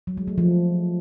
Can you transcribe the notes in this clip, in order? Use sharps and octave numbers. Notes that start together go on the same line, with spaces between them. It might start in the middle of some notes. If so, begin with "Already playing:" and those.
F#3
G#3
A3
F3